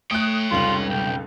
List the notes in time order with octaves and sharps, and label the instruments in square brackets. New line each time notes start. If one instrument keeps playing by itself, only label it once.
[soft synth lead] A3 [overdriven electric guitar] C#5 G5 [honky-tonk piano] D#6 F#6
[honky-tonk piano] F1 C#2 F#7 [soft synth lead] G3 [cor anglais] F4
[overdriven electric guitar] B1 [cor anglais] G5